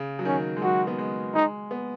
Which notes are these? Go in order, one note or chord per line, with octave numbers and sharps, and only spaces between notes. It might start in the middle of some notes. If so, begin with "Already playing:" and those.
Already playing: C#3
F#3
D#3 C#4
G#3
F#3 F#4
B3
G#3
G#3 D#4
B3